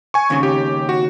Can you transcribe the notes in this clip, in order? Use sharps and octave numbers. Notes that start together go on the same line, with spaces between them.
G#5 C#6
D#2 C#3
G4
F#4